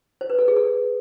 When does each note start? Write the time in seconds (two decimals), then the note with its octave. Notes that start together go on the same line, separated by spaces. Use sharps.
0.21 C5
0.30 B4
0.39 A4
0.48 G#4
0.57 A4